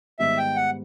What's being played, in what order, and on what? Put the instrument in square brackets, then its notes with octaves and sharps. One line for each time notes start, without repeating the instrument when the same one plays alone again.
[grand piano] G#2 D#3 G3 B3 [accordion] E5
[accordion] G5
F#5